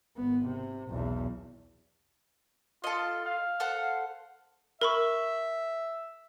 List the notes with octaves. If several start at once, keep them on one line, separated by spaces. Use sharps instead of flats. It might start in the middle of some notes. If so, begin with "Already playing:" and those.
G#1 B3
C3
B1 E2
F4 A4 D#5
F5
A4 C5 F#5
A#4 E5 B5 C#6